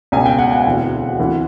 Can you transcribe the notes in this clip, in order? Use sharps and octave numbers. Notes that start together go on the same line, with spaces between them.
C#2 B2 G#5
G5
F#5
F#5
E1 D2 C3 E3
D2 C3 E3